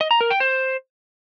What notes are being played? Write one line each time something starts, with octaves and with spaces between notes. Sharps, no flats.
D#5
A#5
A#4
G5
C5